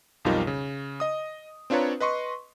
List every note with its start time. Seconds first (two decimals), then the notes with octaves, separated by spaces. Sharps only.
0.25 B1 F2 G3 D#4 F4 A#4
0.47 C#3
1.00 D#5 D#6
1.70 C4 D4 F4 B4 C#5 A#5
2.00 B4 D#5 C6 C#6